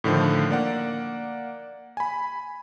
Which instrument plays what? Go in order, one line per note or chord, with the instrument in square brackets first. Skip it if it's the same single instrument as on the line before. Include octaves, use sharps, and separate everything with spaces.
[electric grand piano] A2 D3 D#3 F3
A#3 D5 F#5
G#5 B5